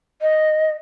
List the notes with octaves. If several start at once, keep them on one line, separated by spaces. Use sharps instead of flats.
D#5